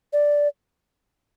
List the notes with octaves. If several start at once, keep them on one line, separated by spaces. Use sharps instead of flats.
D5